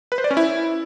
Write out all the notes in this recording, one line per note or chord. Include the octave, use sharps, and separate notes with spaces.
B4
C5
D5
C#4
E4